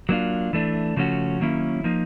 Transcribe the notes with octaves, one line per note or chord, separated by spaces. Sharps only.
F#3 A#3 D4 F4
E3 A3 D4
C#3 F3 A3 C#4 F#4
D#3 F#3 A#3 C#4 E4
F3 A#3 D#4